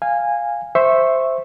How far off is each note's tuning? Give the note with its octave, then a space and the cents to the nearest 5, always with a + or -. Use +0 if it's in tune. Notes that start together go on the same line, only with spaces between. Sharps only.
F5 +0 G#5 -15
C5 +0 E5 +0 C#6 -15